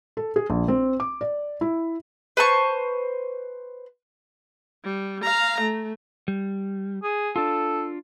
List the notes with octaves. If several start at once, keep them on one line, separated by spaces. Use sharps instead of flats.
A4
G#4
A#1
C4
D6
D5
E4
B4 C5 A5 C#6
G3
F5 A#5
A3
G3
G#4
D4 F4 A4